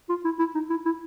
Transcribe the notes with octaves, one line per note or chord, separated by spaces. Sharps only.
F4
E4
E4
D#4
E4
E4